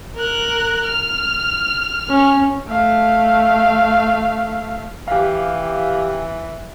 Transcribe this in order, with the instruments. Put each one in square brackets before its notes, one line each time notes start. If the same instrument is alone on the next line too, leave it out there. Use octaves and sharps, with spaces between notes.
[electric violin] A#4 F#6
F6
[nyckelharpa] C#4
[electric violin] A3 F5
[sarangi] E3 [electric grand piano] G4 F5